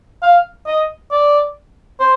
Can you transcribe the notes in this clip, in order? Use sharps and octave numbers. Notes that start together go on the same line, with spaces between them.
F5
D#5
D5
C5